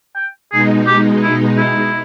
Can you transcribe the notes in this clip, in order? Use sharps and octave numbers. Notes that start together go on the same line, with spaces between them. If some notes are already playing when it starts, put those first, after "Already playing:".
G5
B2 G#3 D#4 G#4
G4
E4
E4